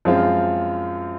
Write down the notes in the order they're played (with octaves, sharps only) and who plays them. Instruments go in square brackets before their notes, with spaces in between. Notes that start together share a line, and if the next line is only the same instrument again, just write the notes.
[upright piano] F#2 F3 G#3 C4 F4